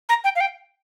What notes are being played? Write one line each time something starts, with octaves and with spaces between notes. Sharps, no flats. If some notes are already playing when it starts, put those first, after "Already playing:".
A#5
G5
F5
G5